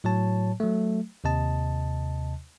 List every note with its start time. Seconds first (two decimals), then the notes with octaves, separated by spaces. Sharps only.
0.04 A2 F#3 C#5 A5
0.60 F#3 A3
1.24 D#2 C3 D#5 A5